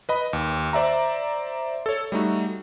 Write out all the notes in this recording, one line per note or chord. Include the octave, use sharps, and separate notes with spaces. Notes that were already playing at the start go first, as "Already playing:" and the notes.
B4 D#5 B5
D#2
C5 D5 E5 A#5
A4 C#5
G3 A3 D#4 F#4